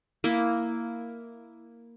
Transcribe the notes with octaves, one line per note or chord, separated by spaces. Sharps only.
A#3 E4